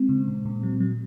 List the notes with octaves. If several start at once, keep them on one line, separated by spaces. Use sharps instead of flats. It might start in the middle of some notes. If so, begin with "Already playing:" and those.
Already playing: G#3 C4
C#3
A#2
A#2
F#3
F#3